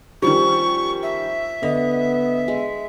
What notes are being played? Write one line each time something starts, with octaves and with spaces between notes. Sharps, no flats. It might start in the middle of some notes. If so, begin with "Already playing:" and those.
D#3 F3 G3 C#4 C#6
E5
D3 B3 D#5
G#3